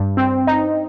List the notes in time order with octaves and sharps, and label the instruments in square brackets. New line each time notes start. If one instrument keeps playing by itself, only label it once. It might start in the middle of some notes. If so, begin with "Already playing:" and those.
Already playing: [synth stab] G2
C4
D#4